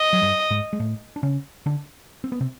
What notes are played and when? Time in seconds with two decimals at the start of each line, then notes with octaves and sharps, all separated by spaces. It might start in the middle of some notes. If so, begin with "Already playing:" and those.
Already playing: D#5
0.13 F#3
0.22 G2 G3
0.50 G#2 G#3
0.73 G#3
0.80 A2 A3
1.16 D4
1.23 C#3 C#4
1.66 D3 D4
2.24 C4
2.32 B3
2.41 C3 C4